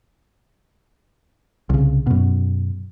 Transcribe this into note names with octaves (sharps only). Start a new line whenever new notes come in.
C2 C#3
F#2 B2